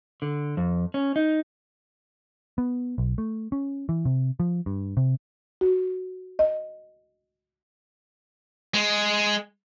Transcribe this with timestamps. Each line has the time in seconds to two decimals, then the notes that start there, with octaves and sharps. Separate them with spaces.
0.22 D3
0.57 F2
0.94 C#4
1.16 D#4
2.58 B3
2.98 B1
3.18 A3
3.52 C#4
3.89 E3
4.05 C3
4.40 F3
4.66 G2
4.97 C3
5.61 F#4
6.39 D#5
8.74 G#3